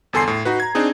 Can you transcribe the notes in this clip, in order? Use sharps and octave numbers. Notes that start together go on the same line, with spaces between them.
G1 E2 A4 G#5 C6 C7
A2
D#4 F#4 B4
A#5 G#6
C4 D4 D#4 G#4